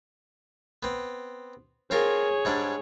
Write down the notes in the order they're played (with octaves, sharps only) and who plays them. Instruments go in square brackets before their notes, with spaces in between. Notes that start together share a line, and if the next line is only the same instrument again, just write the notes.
[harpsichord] B3 C4
[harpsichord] C4 F4 A#4 [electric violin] G#4 C#5
[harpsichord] G#2 G3 D4